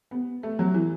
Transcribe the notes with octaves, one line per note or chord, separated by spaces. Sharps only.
B3
A3
F#3
E3